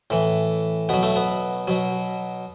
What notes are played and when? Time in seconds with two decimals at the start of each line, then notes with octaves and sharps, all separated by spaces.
0.10 A2 E3
0.89 B2 F#3 B3
1.03 A3
1.16 B3
1.68 B2 F#3